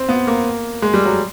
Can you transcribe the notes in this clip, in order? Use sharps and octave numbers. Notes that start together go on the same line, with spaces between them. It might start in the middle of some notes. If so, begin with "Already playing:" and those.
Already playing: C4
B3
A#3
G#3
G3
F#3